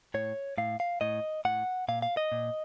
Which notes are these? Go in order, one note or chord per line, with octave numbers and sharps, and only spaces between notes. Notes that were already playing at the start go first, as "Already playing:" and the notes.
A2 C#5
A2 F5
F5
A2 D#5
A2 F#5
A#2 F5
F5
D#5
A#2